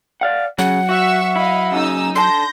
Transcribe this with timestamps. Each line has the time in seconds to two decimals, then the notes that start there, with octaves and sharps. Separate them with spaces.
0.21 D5 F5 F#5
0.59 C#3 F#3 F#5
0.89 F#4 E5 C#6 E6
1.36 E4 D#5 F5 B5
1.72 F#2 C#3 D#4 D#6 E6
2.15 D3 A5 C6 G6 A#6